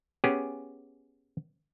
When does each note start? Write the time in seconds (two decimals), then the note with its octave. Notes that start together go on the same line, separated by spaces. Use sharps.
0.24 B3 C#4 G4 G#4